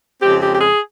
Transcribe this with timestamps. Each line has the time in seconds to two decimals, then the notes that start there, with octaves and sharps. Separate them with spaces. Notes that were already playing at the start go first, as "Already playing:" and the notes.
0.22 F2 C#3 G#3 C4 G4
0.41 G4
0.55 G4
0.60 G#4